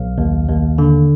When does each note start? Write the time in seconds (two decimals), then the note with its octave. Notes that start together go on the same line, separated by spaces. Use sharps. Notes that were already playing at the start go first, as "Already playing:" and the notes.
Already playing: B1 F5
0.18 D#2
0.48 D#2
0.78 D3